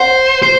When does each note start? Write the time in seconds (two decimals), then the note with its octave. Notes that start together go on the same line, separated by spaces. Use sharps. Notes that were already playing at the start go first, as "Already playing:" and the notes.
Already playing: C5 F#5
0.43 C5